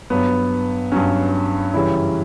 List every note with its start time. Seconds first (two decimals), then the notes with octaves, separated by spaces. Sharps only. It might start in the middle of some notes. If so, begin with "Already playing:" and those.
0.10 G2 F#3 B3
0.92 G2 F#3 C#4
1.73 F#2 C#3 E3 G3 E4